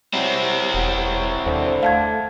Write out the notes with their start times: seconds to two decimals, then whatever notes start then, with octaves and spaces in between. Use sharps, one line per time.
0.13 F#3 C4 E4
0.74 E1 F#3
1.47 D#2 D3 C5
1.83 A3 F5 A5 G#6